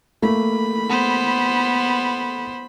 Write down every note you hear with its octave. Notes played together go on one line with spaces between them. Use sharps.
A3 A#3 B5
B3 C5